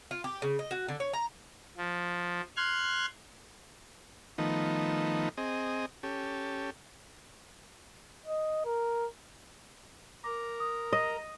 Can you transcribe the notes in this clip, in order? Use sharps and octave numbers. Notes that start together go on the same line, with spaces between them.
F4
G4
C#3
D#5
F#4
D3
C#5
A#5
F3
C6 F6 F#6 G#6
D#3 F3 A3 B3 D#4
C4 G#4 D#5
C#4 G4 A4
D#5
A#4
A#4 A#5 D6
D#6
D#5